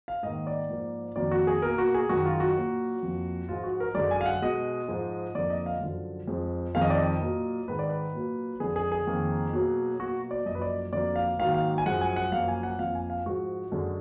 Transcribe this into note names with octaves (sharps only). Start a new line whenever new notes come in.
F5
G#2 D#3 A#3 D#5
D5
G#2 F3 A#3
F2 D#3 F#3 A#3 D5
F#4
G#4
B2 A#3 A#4
F#4
G#4
F#2 D#3 G#3 F#4
F4
F#4
A#2 F#3 A#3
F2 F3 A#3
G#2 F3 G#3 F4
F#4
A#4
F#2 D3 G#3 D5
G#5
F5
F#5
B2 G#3 D#5
G#2 F3 G#3
F2 D3 F3 A#3 D5
D#5
F5
F#2 D3 F3
F2 F3 G#3
F2 D#3 G#3 F5
D#5
D5
D#5
A#2 F#3 A#3
G#2 D#3 G#3 B4
D5
B4
A#2 F#3 A#3
F2 D3 G#3 G#4
G#4
G#4
F2 D#3 A#3
B2 F#3 A#3
B2 F#3 A#3 F#4
D5
F#2 F3 A#3 D#5
B4
D5
F2 D3 F#3 A#3 D5
F5
G#2 D#3 F#3 A#3 F5
F5
G#5
F#2 F3 G#3 F#5
G#5
F#5
F#2 F3 A#3 F5
G#5
F#5
F2 F3 A#3 F5
G#5
F5
G#2 F3 G#3 F#4
F#2 D3 G#3